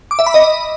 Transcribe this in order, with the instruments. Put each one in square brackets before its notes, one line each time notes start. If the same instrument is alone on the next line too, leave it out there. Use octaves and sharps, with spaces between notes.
[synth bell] D6
E5
B5
D#5